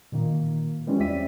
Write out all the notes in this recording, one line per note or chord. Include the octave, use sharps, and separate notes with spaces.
A#2 D#3 A#3
E3 G3 G#3 C#4 F4 G4
E2 C4 D5 E5 B6 D#7